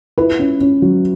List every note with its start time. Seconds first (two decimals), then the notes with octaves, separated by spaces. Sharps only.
0.18 E4 B4
0.39 C#4
0.61 C#4
0.82 F#3